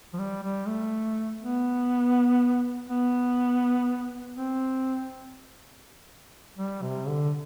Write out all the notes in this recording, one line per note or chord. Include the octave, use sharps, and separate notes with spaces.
F3
G3
G3
A3
B3
B3
C4
G3
C3
D3